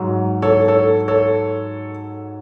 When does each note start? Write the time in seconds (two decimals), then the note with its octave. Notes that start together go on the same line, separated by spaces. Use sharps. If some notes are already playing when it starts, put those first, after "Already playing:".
Already playing: G#2 F#3
0.42 A4 C#5
0.68 A4 C#5
1.08 A4 C#5